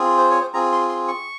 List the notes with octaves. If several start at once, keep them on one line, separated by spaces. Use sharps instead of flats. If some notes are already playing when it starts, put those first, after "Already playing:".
Already playing: C4 F4 G#4
C5
C#5
C5
C4 F4 G#4 A#5
C6
C6
C#6